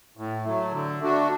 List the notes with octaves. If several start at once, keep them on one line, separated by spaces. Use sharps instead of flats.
A2
F#3 A3
D3
A3 D4 F#4